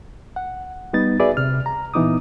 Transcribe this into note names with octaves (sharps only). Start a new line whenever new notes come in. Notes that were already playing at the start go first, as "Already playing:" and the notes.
F#5
G3 B3 D#4 A6
F#4 G#4 B4 D5 E5
C3 F6
A#5
A#2 E3 B3 D#4 D6 D#6